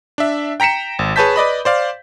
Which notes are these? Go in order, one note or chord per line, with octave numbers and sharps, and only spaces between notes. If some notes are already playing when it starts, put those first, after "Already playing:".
D4 E5
G5 A#5 B6 C#7 E7
G#1
G#4 B4 C#5 A5 G6 B6
B4 D5 D#5 B5
C5 D5 F5